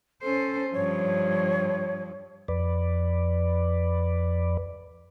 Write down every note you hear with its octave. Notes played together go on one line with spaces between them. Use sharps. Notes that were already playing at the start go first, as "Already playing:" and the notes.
C#4 A4 C5
G2 F3 C#5
F2 B4 D5